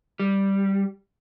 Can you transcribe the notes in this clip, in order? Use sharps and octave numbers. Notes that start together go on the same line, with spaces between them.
G3